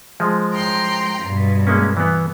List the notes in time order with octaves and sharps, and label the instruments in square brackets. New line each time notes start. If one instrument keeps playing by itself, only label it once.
[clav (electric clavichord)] F3 G#3
[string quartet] G5 A#5 C6
G2 B2
[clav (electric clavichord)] G#3 A#3 C#4
E3 B3